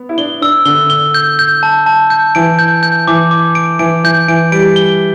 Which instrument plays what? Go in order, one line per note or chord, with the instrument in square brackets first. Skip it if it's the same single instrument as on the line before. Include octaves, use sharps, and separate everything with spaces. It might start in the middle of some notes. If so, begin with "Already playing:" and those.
Already playing: [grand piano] B3
E4
[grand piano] D4 [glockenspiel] G7
[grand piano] D4 [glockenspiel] E6
[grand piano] D3 [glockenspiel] G7
[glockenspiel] G7
G6
G6
A5
A5
G6
[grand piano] E3 [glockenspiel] D7
[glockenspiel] G6
G6
[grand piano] E3 [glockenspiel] D6
[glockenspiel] D6
D7
[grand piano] E3 [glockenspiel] D7
[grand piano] E3 [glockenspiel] G6
[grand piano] E3 [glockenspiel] D7
[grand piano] G3 [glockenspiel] D7
[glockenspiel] G7